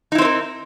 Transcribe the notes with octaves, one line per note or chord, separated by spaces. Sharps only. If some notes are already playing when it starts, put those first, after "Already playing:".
C4 D#4 E4 A#4 C5